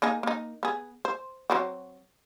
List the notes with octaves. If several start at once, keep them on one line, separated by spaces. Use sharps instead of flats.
A#3 D#4 G#4
A#3 D#4
B3 G#4
C5
F#3 C4 F#4